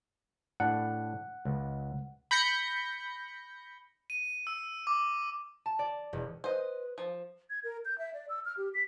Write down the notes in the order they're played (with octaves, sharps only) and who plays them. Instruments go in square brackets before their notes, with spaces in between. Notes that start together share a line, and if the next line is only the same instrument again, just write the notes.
[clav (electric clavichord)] A2 D4 [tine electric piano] F#5
[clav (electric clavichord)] C#2
[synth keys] B5 G6 A#6 C#7
[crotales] D#7
E6
D6
[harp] A5
D5
E1
[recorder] B4 [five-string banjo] C5 D#5
[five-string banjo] F3
[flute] G#6
A#4
G6
E5
D5
E6
F6
G4
B6